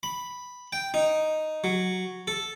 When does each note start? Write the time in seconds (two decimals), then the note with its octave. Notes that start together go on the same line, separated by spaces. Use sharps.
0.03 B5
0.73 G5
0.94 D#4
1.64 F#3
2.27 A4